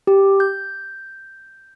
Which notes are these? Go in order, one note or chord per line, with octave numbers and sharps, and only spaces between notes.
G4
G6